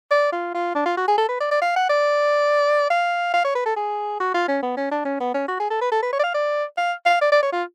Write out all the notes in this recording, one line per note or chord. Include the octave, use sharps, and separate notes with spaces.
D5
F4
F4
D4
F4
F#4
G#4
A4
B4
D5
D5
F5
F#5
D5
F5
F5
C#5
B4
A4
G#4
F#4
F4
C#4
B3
C#4
D4
C#4
B3
C#4
F#4
G#4
A4
B4
A4
B4
C#5
D5
F5
D5
F5
F5
D5
D5
C#5
F4